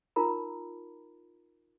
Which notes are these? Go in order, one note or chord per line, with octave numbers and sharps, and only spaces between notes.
D#4 F4 A#4 A#5 B5